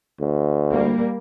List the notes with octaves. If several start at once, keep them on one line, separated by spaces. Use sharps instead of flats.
D2
G3 A#3